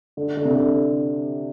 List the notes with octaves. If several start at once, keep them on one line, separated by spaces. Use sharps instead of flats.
D3
D3
C3
D3